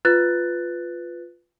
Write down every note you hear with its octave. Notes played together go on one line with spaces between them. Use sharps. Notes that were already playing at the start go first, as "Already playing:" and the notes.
F4 B4 F#6 A6